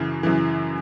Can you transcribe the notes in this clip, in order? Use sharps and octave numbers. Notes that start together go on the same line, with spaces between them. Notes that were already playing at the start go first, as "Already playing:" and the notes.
Already playing: F#2 C#3 E3
F#2 C#3 E3